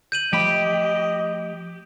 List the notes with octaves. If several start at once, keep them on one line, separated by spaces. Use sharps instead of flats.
G6 D#7 F#7
F3 A3 G4 D#5 B5